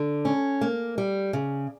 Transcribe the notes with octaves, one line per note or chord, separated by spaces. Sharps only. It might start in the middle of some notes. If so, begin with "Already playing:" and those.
Already playing: D3
C#4
A#3
G3
C#3